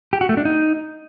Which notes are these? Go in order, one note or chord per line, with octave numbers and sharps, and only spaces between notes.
G4
F#4
A3
D4
D#4